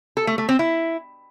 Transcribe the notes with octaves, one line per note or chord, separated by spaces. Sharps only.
A4
A3
A3
C4
E4